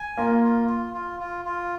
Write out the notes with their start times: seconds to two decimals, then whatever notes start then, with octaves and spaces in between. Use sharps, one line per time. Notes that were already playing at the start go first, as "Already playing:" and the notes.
Already playing: G#5
0.17 A#3 F4
0.44 F4
0.68 F4
0.94 F4
1.20 F4
1.45 F4